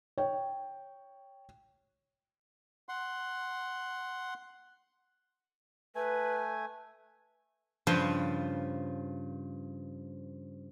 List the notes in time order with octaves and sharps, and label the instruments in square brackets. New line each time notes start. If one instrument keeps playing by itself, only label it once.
[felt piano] C#5 G5
[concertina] F#5 C6
[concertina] A3 G#5 [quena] B4
[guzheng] G2 C#3 F3 B4 C5